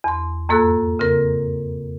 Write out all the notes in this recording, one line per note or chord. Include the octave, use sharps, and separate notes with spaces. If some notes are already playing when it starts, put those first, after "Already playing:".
E2 C6
F2 G#2 A#3 A4 E6 F#6
C#3 C4 A#4